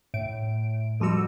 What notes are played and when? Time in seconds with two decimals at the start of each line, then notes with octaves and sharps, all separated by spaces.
0.14 A2 D7
1.00 F2 F3 G3 F#4 E6